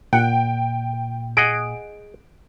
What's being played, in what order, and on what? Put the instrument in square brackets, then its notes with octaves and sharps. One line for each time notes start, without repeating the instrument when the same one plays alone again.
[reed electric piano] A#2 [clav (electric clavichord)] F#5 [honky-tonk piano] G5
[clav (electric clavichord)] G#4 D#5 F#5 [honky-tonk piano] D7